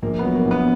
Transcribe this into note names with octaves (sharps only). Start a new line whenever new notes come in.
A#1 A#3
B3
F#3
A#3
A#1
B3